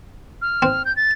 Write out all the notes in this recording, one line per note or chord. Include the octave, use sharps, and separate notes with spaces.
F6
C4
G6
A6